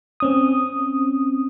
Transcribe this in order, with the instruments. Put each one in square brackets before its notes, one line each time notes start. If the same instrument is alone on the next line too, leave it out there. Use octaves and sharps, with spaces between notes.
[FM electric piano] C4 C#4 D#6